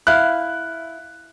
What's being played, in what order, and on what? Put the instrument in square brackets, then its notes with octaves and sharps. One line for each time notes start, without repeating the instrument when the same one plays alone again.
[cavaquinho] E4 F5 [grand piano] F#6